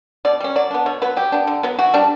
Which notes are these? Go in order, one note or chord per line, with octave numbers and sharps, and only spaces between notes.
B2 D5
G3 C#4
F#3 D5
B3 D4
B2 C#5
F#3 B3 B4
F#3 G4
B3 D4
D3
F#3 B3
E3 F#4
G3 D4